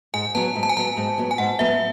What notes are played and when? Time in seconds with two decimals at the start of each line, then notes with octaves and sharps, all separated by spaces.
0.14 G#2 G#5
0.35 F#3 B3 A5
0.55 G#2
0.63 A5
0.69 G#5
0.77 F#3 B3 A5
0.97 G#2
1.18 F#3 B3
1.31 G#5
1.38 G#2 F#5
1.59 F#3 B3 E5